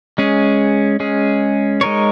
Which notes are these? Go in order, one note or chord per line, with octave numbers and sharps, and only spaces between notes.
G#3 C#4 G#4
G#3 C#4 G#4
G#3 D#4 A#4 C#5